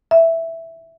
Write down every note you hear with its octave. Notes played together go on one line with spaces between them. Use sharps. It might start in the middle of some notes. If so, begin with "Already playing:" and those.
E5